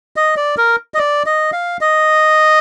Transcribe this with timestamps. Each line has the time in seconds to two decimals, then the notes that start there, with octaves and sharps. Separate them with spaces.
0.16 D#5
0.37 D5
0.58 A#4
0.94 D#5
0.98 D5
1.26 D#5
1.53 F5
1.81 D#5